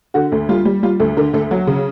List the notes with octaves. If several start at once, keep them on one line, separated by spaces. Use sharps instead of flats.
D3 F#4
D2
G3 F4
G3
G3 F4
D2 A4
D3 A#4
D2 A4
F#3
C#3